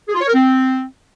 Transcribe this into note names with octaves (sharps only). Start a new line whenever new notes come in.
G#4
F4
C#5
A#4
C4